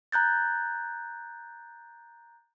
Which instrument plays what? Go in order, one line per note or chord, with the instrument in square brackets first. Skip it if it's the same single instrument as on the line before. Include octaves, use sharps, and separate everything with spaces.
[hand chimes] A#5 F#6 G6 A6